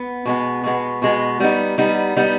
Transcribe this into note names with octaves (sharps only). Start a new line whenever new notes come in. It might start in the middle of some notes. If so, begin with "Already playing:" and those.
Already playing: B3
B2 G#3 B3
B2 G#3 B3
B2 G#3 B3
G3 B3 D#4
G3 B3 D#4
G3 B3 D#4